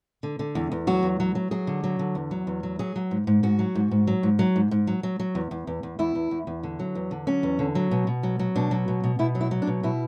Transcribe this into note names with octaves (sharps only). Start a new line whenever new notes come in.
D3
D3
E2
E2
F#3 F#4
E2
F#3
F#3
F#3 G#4
D3
F#3
D3
E2
F#3
E2
F#3
F#3 G#4
F#3
G#2
G#2
G#2 F#4
F#3
G#2
G#2
F#3
G#2
F#3
G#2
G#2
F#3
F#3
F#3
E2
E2
E2
E2
E2 E4
E2
E2
E2
D3
F#3
E2
D3
F#3 C#4
E2
D3
F#3
B2
B2
F#3
F#3
B2 D4
F#3
B2
B2
B2 E4
F#3
E4
F#3
D4
B2
B2 E4